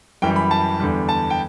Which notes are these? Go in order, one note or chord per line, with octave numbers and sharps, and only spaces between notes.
F#2 E3 G3 G5
B5
A5
E2 D3 G3
A5
G5